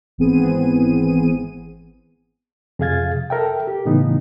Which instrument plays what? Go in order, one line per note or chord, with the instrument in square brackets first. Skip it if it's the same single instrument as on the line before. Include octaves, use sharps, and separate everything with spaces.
[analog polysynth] G#1 E3 B3 C4 G#4 D#7
[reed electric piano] F2 C3 G#4 F5 G#6 A6
A4 A#4 E5 G5
G4
A2 C#3 E3 B3 D#4